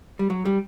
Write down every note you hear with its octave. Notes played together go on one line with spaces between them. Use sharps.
G3
F#3
G3